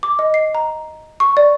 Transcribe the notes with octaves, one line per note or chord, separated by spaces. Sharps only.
D6
D#5
C7
A#5
C#6
D5